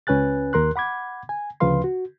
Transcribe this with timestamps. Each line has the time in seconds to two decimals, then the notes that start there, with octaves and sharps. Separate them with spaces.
0.07 C#2 C#4 B4 G#5 F#6 A6
0.53 D#2 A#4 C6 F#6
0.76 F#5 B5 D6 G#6
1.29 G#5
1.60 D2 C#3 F3 B4 F5 C6
1.84 F#4